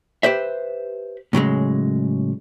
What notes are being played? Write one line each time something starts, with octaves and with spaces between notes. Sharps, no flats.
G4 B4 C5 E5
A2 C#3 F#3 G#3